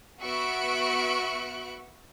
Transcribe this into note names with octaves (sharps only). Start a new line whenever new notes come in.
B3 F#4 E5 C#6 F#6 D7